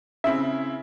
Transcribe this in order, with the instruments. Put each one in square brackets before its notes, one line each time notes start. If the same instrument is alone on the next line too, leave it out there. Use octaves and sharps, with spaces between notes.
[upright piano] C#3 C4 E4 [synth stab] E5